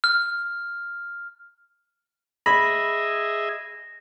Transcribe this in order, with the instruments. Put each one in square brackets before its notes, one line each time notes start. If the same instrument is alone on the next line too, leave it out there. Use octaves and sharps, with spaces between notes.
[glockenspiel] F6
[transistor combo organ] G#4 D#5 E5 [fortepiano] B5 [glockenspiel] A#6